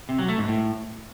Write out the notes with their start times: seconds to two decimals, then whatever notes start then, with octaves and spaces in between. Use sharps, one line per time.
0.09 C3
0.19 F#3
0.28 A3
0.38 G#2
0.48 A2